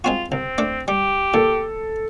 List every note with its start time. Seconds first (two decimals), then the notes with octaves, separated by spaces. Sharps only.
0.04 G#3 C4 F4 F#4
0.32 C2 C4
0.58 A3 D4 A4
0.88 G3 G4
1.34 A#2 A4